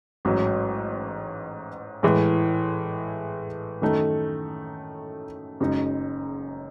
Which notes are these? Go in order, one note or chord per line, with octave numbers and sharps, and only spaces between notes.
A1 G#2 F#3 C#4
A2 E3 G#3
F#2 D#3 A3 D#4 A4
F#1 F#2 C#3 G#3 D#4